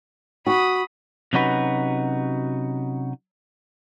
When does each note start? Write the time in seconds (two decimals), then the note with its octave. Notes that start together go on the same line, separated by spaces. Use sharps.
0.47 F#4 B5 D#6
1.33 C3 F#3 C#4 D#4 F#4 B4